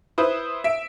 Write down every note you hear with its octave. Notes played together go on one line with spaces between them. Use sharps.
E4 B4 C5 D#6
E5 D7